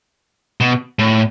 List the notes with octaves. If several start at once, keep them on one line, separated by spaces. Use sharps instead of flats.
B2
A2